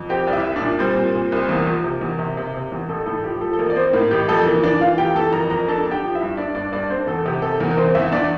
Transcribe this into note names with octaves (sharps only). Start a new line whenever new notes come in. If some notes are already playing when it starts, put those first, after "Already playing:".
Already playing: F2
C4 G4 G5
C2 D5
E4 E5
C2
D4 D5
A#2
G3 C4 C5
A#2
A#2
C2
E2 A#3 A#4
F3
C3
E2
C3
C3
C3
E2
A1 A4
A2 A4
F3 G4
F3 A4
A4
A1 A#3 A#4
D5
C4 C5
A2 A#3 A#4
A1 G4
F2 A4
E3 A#3 A#4
E3 D4 D5
E3 F4 F5
F1 G4 G5
E3 A4 A5
F2 A#4 A#5
F2 A#4 A#5
D4 A4 A5
D4
G4 G5
F3
E4 E5
G2
G2 D4 D5
G2 D4 D5
G2 D4 D5
C4 D4 C5
E2 A4
C3 G4
C3 A4
E2 A#3 A#4
A#4
E2 C4 C5
E2 E4 E5
E2 D4 D5